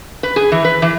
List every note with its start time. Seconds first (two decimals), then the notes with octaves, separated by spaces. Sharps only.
0.23 B4
0.36 G#4
0.52 E3
0.65 B4
0.82 E3